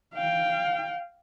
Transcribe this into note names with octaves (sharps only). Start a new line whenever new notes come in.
F5 G5